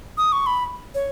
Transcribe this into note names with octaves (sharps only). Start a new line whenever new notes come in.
D#6
C#6
B5
C#5